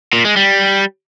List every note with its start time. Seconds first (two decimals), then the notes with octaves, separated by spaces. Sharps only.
0.13 A#2
0.25 G#3
0.36 G3